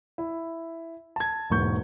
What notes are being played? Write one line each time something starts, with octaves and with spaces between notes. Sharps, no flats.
E4
A5 G#6
E1 E2 G#2 A#3 C#6 G6